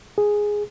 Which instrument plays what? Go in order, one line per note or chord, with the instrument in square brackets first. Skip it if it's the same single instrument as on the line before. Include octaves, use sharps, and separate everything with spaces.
[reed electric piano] G#4